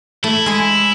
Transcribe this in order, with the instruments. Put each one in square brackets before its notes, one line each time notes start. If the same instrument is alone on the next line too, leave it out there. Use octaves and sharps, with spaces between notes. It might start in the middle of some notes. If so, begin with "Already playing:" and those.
[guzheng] A3 [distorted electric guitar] E4
[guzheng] G#3 G#4